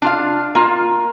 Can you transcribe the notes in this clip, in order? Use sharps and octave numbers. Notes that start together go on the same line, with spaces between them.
D4 F4 F5
A#3 F4